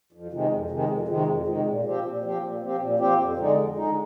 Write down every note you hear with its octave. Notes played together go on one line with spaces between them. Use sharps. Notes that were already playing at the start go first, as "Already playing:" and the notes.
F2
C3 D#3 G#3
F2
C3 D#3 G#3
F2
C3 D#3 G#3
F2
C3 D#3 G#3
A#2
F3 C4 G4
A#2
F3 C4 G4
A#2
F3 C4 G4
A#2
F3 C4 G4
F2
D3 G#3 D#4
F2
D3 G#3 D#4